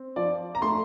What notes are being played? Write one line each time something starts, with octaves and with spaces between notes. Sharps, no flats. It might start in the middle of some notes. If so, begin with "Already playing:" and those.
Already playing: C4
F3 D5
A#5
A3 C6